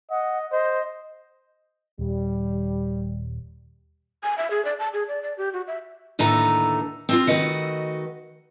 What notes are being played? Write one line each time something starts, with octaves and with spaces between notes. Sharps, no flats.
D#5 F#5
C5 D#5
D#1 G3
G#5
E5
G#4
D5
A5
G#4
D5
D5
G4
F#4
E5
D#2 A2 D3 A3 B4 A#5
C4 D#4 F4
D#3 A3 F#4 B4 D#5 F#5